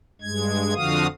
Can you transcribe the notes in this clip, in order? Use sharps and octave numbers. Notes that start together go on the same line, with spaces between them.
G2 G#3 G#6
F2 D3 F3 F#4 F5 D#6